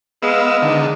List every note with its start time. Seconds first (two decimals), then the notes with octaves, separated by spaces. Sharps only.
0.23 G#3 B3 F5 E6
0.62 D3 D#3